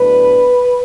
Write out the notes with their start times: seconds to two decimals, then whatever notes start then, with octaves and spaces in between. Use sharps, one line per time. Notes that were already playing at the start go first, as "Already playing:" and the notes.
Already playing: A2 F#3 B3 D4 B4